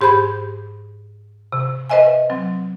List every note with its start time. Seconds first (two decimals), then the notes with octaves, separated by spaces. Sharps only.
0.01 G#2 G4 C5 B5 G6 G#6
1.52 C3
1.90 B4 C5 D#5 E5 G#5
2.30 F#3 C4